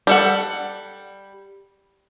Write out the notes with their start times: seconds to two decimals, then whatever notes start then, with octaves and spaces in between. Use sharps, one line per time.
0.07 G3 A4 F#5